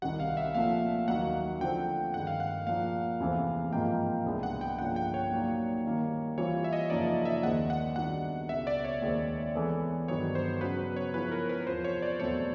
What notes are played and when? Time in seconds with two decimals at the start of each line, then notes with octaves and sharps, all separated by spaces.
0.02 C2 C3 D#3 G3 F#5
0.20 F5
0.37 E5
0.55 A#2 F3 A3 F5
1.08 D#2 D#3 F#3 A#3 D#4 F#5
1.61 D3 F3 A3 C4 G5
2.14 G2 D#3 G#3 F#5
2.27 F5
2.40 F#5
2.67 A#2 F3 A#3 F5
3.20 E2 C3 E3 A3 C4
3.72 G#2 F3 A#3 G5
4.26 C2 B2 G#3 B3 D4
4.43 F#5
4.61 G5
4.79 G2 D3 F3 A#3 C#4 F#5
4.96 G5
5.14 C#5
5.32 A#2 F#3 A#3 D#4
5.85 D#3 G3 A#3
6.38 E3 G3 C4 F4 C#5
6.64 E5
6.73 D#5
6.90 F#2 C#3 F3 A#3 D#4 D5
7.25 E5
7.43 D#2 D#3 G#3 C4 F#5
7.70 F#5
7.96 D#3 G3 B3 D4 F#4 F#5
8.49 C#2 B2 G#3 E5
8.67 D5
8.85 C#5
9.02 D#2 D#3 G#3 C4
9.55 E3 G#3 B3 E4 A4
10.08 G2 D#3 F#3 B3 C#5
10.35 C5
10.61 C#3 F#3 B3 B4
10.96 C#5
11.14 F3 G#3 B3 E4 G#4 B4
11.32 A#4
11.49 B4
11.67 E2 C3 F3 C5
11.84 C#5
12.02 D5
12.20 E2 B2 F#3 A3 C4 C#5